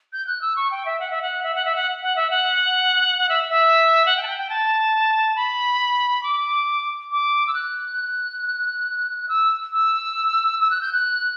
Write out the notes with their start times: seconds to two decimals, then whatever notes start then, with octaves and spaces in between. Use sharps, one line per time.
0.13 G6
0.27 F#6
0.41 E6
0.56 C#6
0.71 G5
0.86 E5
1.00 F#5
1.10 E5
1.22 F#5
1.43 E5
1.55 F#5
1.65 E5
1.75 F#5
2.02 F#5
2.16 E5
2.30 F#5
3.18 F#5
3.29 E5
3.50 E5
4.06 F#5
4.17 G5
4.23 A5
4.27 G5
4.38 G5
4.49 A5
5.36 B5
6.23 D6
7.11 D6
7.47 E6
7.54 F#6
9.29 E6
9.73 E6
10.59 E6
10.70 F#6
10.81 G6
10.93 F#6